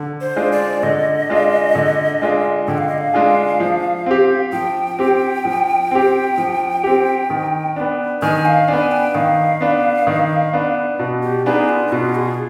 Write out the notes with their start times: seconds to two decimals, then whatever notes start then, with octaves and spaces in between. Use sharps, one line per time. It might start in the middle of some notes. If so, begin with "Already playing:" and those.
Already playing: D3
0.21 C5
0.36 G#3 D4 F4 G#4
0.52 D5
0.83 D3 D#5
1.29 G#3 D4 F4 G#4
1.75 D3
2.21 G#3 D4 F4 G#4
2.68 D3 G5
2.78 F5
2.88 D#5
2.98 F5
3.14 G#3 D4 F4 G#4
3.60 F3
4.06 C4 G4
4.52 F3 G5
4.99 C4 G4
5.45 F3
5.91 C4 G4
6.38 F3
6.84 C4 G4
7.30 D#3
7.76 B3 D4
8.22 D#3 G#5
8.45 F5
8.68 B3 D4 G#5
8.91 G5
9.15 D#3 F5
9.61 B3 D4
10.07 D#3
10.53 B3 D4
10.99 B2
11.23 G4
11.46 B3 D4 D#4 G#4
11.69 F4
11.87 D#4
11.92 B2 F4
12.15 G#4